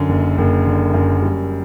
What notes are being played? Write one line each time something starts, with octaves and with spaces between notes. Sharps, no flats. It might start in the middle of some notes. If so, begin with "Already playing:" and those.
Already playing: F#2 D3
F#1
F#1
D3
F#2
G3